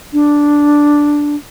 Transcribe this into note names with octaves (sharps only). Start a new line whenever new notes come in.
D4